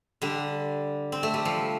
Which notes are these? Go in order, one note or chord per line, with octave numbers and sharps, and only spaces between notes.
D3 G3
C4
A3
G3
F3